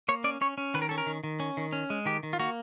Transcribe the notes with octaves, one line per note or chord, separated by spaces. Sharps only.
A#3 C#5
C#4 D5
C#4 C#5
C#4
D#3 B4
A#4
C#4 A4
A#4
D#3
D#3
C#4
D#3
C#4
G#3
D#3 G4
D#3
F4
A#3 F#4